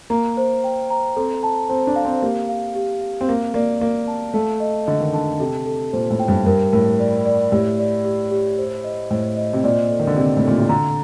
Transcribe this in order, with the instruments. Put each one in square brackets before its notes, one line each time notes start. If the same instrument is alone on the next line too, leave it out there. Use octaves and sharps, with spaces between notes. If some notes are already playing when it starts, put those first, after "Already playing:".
[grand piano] A#3 [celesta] A#5
[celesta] C5
G5
A#5
[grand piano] C4 [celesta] A4
[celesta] A5
[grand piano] C4 [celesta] C5
[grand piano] D4
[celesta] F5
[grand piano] C4
[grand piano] A#3 [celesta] G4
[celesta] F5
G4
F5
[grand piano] C4
[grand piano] A#3 [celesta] F5
[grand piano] A#3 [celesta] D5
[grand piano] A#3 [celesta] F5
[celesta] A5
[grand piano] A3 [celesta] A5
[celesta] D#5
[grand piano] D3 [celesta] D#5
[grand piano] D#3
[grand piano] D3 [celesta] A5
[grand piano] C3 [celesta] A4
[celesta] A4
[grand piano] A#2 [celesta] C5
[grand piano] A2
[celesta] G5
[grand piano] G2
[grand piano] G2 [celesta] A#4
[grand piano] A2 [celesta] A#4
[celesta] D5
D5
[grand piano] A2 [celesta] G4
[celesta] D5
G4
G4
C5
D#5
[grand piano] A2 [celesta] C5
[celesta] D#5
[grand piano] C3
[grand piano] A#2 [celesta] D5
[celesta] A4
[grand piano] D#3
D3
[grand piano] C3 [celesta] D5
[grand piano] A2
[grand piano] A#2 [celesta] A4
[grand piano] C3
[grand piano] D3 [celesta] A#5